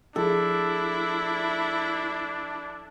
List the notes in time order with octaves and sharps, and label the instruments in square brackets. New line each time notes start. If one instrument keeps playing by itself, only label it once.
[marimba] F3 G#4 [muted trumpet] D4 [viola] E4 [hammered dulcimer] A4